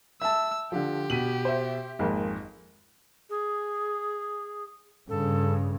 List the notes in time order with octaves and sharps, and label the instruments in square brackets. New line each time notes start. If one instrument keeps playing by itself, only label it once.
[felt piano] E5 A5 [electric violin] E6
[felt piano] D3 F3 [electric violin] G4
[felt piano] B2 [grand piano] B6 D#7 F#7
[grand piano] C5 E5
[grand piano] G#1 F2 [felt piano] G#3 A#3
[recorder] G#4
[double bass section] G2 C#3 [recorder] A4